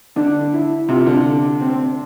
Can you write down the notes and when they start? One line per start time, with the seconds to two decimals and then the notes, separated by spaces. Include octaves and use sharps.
0.16 D3 D4
0.53 E4
0.88 C3 F4
1.07 D3
1.61 C4